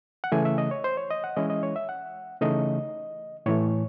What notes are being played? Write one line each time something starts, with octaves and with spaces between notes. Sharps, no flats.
F#5
C#3 E3 A3 G#5
E5
D#5
C#5
C5
C#5
D#5
F#5
E3 G#3 C#4 E4 D#5
D#5
C#5
E5
F#5
C#3 E3 A3 D#4 D#5
A2 E3 A3 C#5